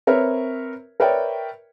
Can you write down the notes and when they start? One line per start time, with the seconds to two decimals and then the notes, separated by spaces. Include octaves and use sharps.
0.07 C4 A#4 B4 C#5 E5
1.00 A#4 B4 C#5 D5 E5 G5